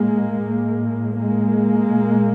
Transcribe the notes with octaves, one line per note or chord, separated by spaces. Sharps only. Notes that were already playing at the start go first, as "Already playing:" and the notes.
Already playing: A2 G#3 A#3
A2
G#3 A#3
A#2